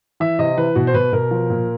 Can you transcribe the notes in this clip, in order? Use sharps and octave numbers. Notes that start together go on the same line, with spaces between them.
E3 E5
C3 D#5
E3 B4
B2 F#4
C5
B2 B4
B2 A#4
F3
A#2